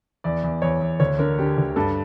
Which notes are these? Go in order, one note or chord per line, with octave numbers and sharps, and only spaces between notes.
E2 D5
E2
E2 C#5
E2
D2 C#5
D3 A#4
D3 G4
D2
G2 A4